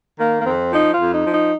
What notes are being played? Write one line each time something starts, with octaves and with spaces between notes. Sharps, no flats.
D#3 A#3
A#3
F2 C4
F3 D#4
F4
F2
D#4
F3
D#4